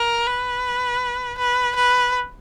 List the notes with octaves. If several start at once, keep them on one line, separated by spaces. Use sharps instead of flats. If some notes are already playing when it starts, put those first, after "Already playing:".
Already playing: A#4
B4
B4
B4